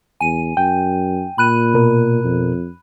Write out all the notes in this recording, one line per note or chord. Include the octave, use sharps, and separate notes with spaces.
E2 G#5 D#7
F#2 G5
A#2 B5 F#6 D#7
B2 A#4
F2